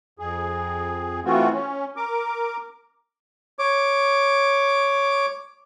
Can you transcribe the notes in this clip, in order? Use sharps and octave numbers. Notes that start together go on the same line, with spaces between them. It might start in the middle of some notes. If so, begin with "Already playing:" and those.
F2 G#4
E3 A3 C4 F4 F#4
C#4
A#4 D6
C#5 D6